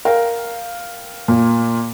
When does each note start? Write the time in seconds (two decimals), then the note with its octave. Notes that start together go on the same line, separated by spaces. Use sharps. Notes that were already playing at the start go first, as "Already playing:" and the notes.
0.05 A#4 F5 G5
1.28 A#2